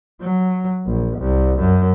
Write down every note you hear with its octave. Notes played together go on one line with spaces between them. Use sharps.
F#3
A#1
C2
F#2